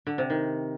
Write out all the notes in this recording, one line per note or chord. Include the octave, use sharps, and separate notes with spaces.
D3
C3
D#3